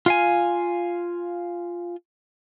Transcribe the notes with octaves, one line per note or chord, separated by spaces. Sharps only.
F4 F5 G#5